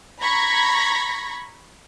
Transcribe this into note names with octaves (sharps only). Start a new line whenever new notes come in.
A#5 B5 C#6 G#6 A#6 B6